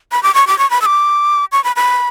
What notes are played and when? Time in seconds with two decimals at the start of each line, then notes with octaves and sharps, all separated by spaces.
0.12 B5
0.23 D6
0.35 C#6
0.47 D6
0.58 C#6
0.71 B5
0.82 E6
0.86 D6
1.52 C#6
1.64 B5
1.76 B5